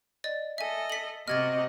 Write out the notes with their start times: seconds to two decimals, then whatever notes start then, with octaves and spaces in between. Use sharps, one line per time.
0.24 D5 D#5 A6
0.58 A4 D#5 E5 G#5
0.90 B6 F#7
1.28 C3 F#4 G4 D#5 F6 G#6 A6